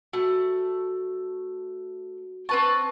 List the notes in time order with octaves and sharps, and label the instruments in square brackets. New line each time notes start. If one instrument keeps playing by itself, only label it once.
[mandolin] A3 [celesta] F#4
[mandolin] C4 B4 A5 [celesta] C#6